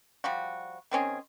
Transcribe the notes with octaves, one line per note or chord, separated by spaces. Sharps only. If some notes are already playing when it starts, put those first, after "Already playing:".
F3 G3 F#4
D#3 C4 C#4 G#4